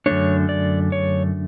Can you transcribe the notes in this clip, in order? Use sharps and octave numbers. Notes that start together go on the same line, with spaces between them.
F#2 D3 A3 D4 C#5
D5
C#5